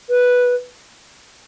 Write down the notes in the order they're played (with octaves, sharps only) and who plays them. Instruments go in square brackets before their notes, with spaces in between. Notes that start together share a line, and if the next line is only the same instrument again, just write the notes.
[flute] B4